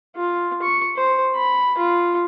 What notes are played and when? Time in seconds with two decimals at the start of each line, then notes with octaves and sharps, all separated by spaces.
0.16 F4
0.62 C#6
0.97 C5
1.36 B5
1.78 F4